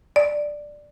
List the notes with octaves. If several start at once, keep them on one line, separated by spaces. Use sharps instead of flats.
D5